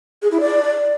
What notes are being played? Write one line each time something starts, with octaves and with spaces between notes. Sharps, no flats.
G#4
E4
D5